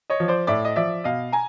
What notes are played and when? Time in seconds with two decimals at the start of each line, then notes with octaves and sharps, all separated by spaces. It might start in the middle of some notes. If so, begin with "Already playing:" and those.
0.10 C#5 D#5
0.20 F3
0.28 C5 D5
0.47 A2 D5 E5
0.65 D#5
0.76 F3 D5 E5
1.04 B2 D#5 F5
1.33 G#5 A#5